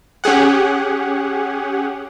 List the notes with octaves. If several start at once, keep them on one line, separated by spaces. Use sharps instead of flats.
C#4 G4 G#4 F#5